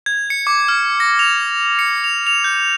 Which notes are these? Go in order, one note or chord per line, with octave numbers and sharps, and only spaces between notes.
G#6
C#7
D6
F6
A#6
F7
C#7
F7
F7
G6